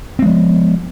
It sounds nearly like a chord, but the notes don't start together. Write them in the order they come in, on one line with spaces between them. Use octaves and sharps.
C4 G#3 F3 B3